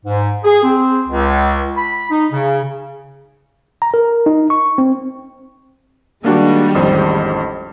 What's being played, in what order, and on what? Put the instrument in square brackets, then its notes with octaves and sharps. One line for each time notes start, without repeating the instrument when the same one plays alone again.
[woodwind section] G#2
G#4
C4
C#2
B5
D#4
C#3
[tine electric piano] A#5
A#4
D#4
C#6
C4
[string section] D#3 G3 G#3 [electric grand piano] A#3 D4 F#4
[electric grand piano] A1 F2 C5